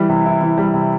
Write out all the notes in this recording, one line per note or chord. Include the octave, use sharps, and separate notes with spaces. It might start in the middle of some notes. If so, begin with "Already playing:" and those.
Already playing: E3 G3
C3
E4
E3
G3
C3